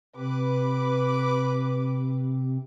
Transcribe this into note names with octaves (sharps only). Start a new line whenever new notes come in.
C3 C4 B4 D6